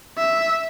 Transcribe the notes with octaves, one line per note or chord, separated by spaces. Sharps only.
E5